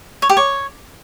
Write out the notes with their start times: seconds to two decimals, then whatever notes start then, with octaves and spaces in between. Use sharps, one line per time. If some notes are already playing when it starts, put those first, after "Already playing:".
0.22 C#5
0.29 G4
0.37 C#5